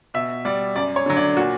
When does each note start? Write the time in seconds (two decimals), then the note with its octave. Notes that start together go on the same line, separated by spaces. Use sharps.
0.14 B2 E5
0.45 G3 D5
0.76 F#2 D5
0.96 C#5
1.06 D3 F#3
1.17 D5
1.37 A#2 F#4